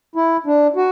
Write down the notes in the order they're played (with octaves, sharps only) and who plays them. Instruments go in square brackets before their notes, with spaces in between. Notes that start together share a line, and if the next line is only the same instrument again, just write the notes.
[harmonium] E4
D4
F#4